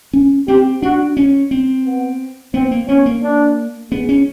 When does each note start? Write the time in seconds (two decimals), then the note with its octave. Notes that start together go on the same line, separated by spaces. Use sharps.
0.13 C#4
0.48 C4 G4
0.82 D4 F#4
1.17 C#4
1.51 C4
1.85 B3
2.54 B3 C4
2.71 A#3
2.88 B3 C#4
3.06 A#3
3.23 D4
3.92 B3 G#4
4.09 C#4